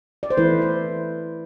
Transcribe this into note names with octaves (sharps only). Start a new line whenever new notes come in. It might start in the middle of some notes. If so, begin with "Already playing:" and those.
D5
C5
E3 A3 E4 B4
C5